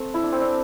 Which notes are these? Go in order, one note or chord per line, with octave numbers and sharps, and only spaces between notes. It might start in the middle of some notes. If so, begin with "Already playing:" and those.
Already playing: A3 C4
E4
D4
C4
D4